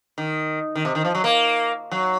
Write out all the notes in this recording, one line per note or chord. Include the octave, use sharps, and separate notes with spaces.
D#3
D#3
C3
D#3
F3
F#3
A#3
F#3